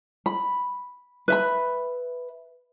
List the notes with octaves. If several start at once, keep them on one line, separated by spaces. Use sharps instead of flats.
B5
B4 E5 B5